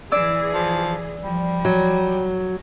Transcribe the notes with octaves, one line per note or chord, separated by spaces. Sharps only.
E3 G#4 D5 E6
F3
F3 G3
F#3